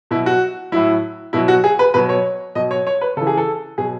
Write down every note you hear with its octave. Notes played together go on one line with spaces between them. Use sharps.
B2 F#3 E4
F#4
A2 F#3 E4
B2 F#3 E4
F#4
G#4
B4
B2 F#3 B4
C#5
B2 F#3 D#5
C#5
C#5
B4
C#3 E3 A4
G#4
A4
B2 F#3 G#4